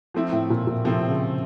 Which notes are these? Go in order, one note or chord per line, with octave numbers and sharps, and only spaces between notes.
F3 A3 C4 E4
A2
A#2
A#2
C3 F3 A3 C4 E4
C#3